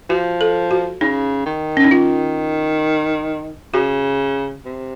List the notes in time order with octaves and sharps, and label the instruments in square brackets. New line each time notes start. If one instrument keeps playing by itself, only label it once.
[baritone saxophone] F3 [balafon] F#4
[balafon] A4
F#4
[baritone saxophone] C#3 [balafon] D#4
[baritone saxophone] D#3
[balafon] C#4
D#4
[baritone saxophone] D#3 [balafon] F4
[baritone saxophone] C#3 [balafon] F#4
[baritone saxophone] C3